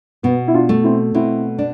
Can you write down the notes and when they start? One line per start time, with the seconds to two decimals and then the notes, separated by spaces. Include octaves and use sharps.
0.23 B2 B3
0.48 E4
0.53 D4 F4
0.69 A3
0.83 C4 E4
1.14 B2 C4 E4
1.59 D4